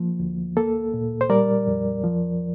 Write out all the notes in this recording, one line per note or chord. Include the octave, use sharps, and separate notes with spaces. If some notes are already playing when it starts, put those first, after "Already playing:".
Already playing: F3 A#3
D2
A#3 A4
A#2
C5
G3 A#4 D5
F2
F3